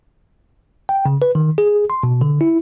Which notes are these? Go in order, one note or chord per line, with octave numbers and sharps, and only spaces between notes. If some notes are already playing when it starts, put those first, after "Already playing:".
G5
C#3
B4
D#3
G#4
C6
B2
D3
E4